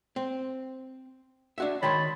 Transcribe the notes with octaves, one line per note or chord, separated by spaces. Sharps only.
C4
D4 F#4 E5
D#3 C#5 G5 A5 B5 C6